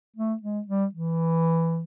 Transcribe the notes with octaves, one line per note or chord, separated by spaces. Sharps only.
A3
G#3
G3
E3